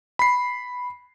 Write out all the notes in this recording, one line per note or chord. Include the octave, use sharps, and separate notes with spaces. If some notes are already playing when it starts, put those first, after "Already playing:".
B5 C7